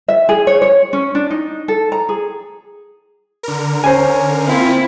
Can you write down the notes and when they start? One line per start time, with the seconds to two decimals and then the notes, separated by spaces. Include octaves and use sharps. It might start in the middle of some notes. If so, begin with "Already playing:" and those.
0.08 E5
0.29 G#4
0.47 C#5
0.62 C#5
0.93 C#4
1.15 D4
1.30 D#4
1.68 A4
1.92 A#5
2.09 G#4
3.43 D3 A#4
3.84 C#4 C5 G#5
4.47 A#3 C4 E4 F4